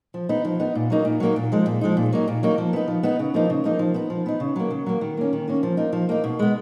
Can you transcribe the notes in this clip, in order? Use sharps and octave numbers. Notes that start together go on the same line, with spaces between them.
F3
B3 D#4
F3
B3 D#4
A#2
F#3 A#3 D#4
A#2
F#3 A#3 D#4
A#2
F3 G#3 D#4
A#2
F3 G#3 D#4
A#2
F#3 A#3 D#4
A#2
F#3 A#3 D#4
F3
B3 D#4
F3
B3 D#4
C#3
F3 A#3 D#4
C#3
F3 A#3 D#4
F3
B3 D#4
F3
B3 D#4
C#3
F#3 A#3
C#3
F#3 A#3
D#3
A#3 C#4
D#3
A#3 C#4
F3
A#3 D#4
F3
A#3 D#4
B2
G#3 B3